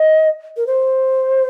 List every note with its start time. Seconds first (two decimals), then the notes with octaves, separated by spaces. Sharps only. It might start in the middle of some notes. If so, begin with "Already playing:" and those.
Already playing: D#5
0.57 A#4
0.67 C5